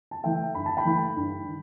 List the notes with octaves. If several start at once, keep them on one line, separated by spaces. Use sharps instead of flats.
A5
E3 A3 E5 G5
G2 B5
A5
G5 B5
E3 A3
G2
D#3